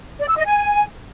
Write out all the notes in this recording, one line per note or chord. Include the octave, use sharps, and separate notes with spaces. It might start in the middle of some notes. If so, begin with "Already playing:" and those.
D5
E6
D#5
G#5